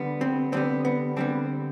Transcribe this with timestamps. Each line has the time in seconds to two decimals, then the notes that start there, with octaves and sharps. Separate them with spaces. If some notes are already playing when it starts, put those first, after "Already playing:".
Already playing: D3 G3 B3
0.21 C4
0.52 D3 G3 B3 C4
0.85 B3
1.16 D3 G3 B3 C4